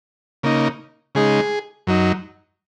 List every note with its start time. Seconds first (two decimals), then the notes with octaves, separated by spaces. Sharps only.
0.43 C#3 A#3 D#4
1.15 C#3 G#3 D#4 G#4
1.87 F#2 F#3 D#4